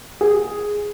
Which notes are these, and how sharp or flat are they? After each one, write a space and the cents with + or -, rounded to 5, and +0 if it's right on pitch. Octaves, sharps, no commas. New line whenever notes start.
G#4 +0